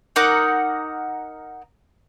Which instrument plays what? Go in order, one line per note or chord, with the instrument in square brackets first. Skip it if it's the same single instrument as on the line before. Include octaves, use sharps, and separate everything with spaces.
[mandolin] D#4 A#4 F#5 D6